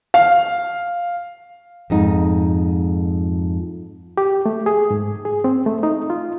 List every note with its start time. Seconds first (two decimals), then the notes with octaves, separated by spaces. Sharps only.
0.14 F5
1.90 F2 G#2 D#4
4.17 G4
4.46 A3
4.66 G#4
4.91 G#2
5.25 G#4
5.44 C4
5.66 A3
5.83 D#4
6.10 F4